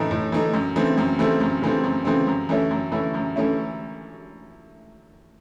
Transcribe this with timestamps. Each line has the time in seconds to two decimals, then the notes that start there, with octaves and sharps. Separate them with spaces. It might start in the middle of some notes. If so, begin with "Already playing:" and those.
Already playing: A2 E3 A3 D#4
0.11 A2
0.32 E3 A3 D#4
0.54 F#2
0.76 C#3 E3 A3 C4
0.98 F#2
1.19 C#3 E3 A3 C4
1.40 F#2
1.62 C#3 E3 A3 C4
1.84 F#2
2.05 C#3 E3 A3 C4
2.27 F#2
2.49 E3 A3 C#4 E4
2.71 F#2
2.92 E3 A3 C#4 E4
3.14 F#2
3.36 E3 A3 C#4 E4